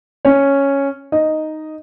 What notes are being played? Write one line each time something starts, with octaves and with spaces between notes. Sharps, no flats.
C#4 C#5
D#4 D#5